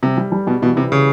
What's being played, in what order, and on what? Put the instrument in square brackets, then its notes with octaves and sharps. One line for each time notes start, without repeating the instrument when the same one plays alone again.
[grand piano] C3 [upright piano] G3
[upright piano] G3
G3
[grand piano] B2 [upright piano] G3
[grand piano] B2 [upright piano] E3
[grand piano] C3 [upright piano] E3
[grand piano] C#3